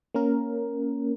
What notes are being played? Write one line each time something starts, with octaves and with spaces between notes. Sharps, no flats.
A#3 C#4 A#4